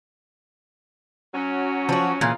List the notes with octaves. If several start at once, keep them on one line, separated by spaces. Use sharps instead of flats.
F#3 C#4
F3 F#4
A#2 E3 C#4 G#4 F5